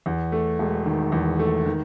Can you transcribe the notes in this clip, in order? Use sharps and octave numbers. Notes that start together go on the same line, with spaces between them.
E2
A3
E1
D#3
E2
A3
D#3